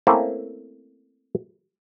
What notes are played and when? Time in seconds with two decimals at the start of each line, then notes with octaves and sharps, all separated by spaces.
0.07 A3 A#3 C4 C#4 E4 C5